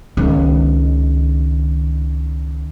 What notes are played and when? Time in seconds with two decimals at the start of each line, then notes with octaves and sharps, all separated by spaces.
0.17 C#2 D#3